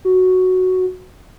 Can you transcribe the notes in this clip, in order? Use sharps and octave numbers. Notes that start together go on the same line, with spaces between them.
F#4